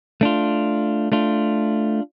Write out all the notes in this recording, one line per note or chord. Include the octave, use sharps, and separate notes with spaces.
A3 D4 F4
A3 D4 F4